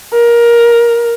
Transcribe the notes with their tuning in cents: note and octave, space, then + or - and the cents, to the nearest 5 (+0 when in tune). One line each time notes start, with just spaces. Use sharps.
A#4 +15